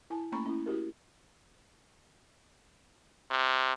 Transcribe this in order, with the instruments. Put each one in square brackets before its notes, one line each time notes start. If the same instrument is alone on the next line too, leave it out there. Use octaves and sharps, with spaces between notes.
[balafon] E4 G#5 A5
A3 A#3 C#4 A#5 B5 C#6
C#4 E4
E4 F#4 G4 A#4
[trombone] C3